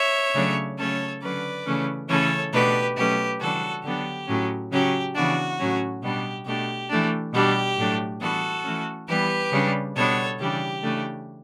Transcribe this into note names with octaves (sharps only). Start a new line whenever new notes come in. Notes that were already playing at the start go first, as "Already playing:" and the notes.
Already playing: C#5 E5
C#3 F#3 A3 D4
C#3 F#3 A3 C#4 A4 C#5
D3 F#3 C#4 B4 D5
C#3 E3 A3 C#4
C#3 E3 A3 C#4 A4 C#5
B2 A3 D4 G4 B4
B2 F#3 A3 C#4 G4 B4
C#3 E3 G3 D4 F#4 A4
D3 F#3 B3 D4 G4
A2 F#3 C#4
C#3 F#3 C#4 G4
C#3 E3 B3 D4 F#4
A2 F#3 C#4
B2 G3 B3 D4 G4
B2 A3 D4 G4
E3 A3 D4
B2 G3 D4 G4
A2 F#3 A3 D4
E3 G3 B3 D4 F#4 A4
E3 A3 C#4
E3 G3 B3 G4 B4
C#3 G3 D4
B2 G3 B3 D4 A4 C#5
C#3 E3 G3 D4 G4
C#3 E3 A3 D4